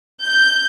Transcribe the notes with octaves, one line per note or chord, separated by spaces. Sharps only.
G6